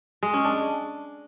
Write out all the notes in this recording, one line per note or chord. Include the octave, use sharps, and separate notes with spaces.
G#3
C#4
D4